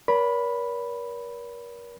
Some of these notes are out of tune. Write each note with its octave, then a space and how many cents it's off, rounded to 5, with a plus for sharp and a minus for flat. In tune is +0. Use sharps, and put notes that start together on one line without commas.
A#4 +35 C#5 +45 B5 +0